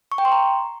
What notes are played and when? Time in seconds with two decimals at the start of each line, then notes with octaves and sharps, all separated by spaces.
0.12 C#6
0.18 G5
0.25 C6
0.32 A#5